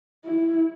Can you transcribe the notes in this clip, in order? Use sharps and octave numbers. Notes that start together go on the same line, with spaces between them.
E4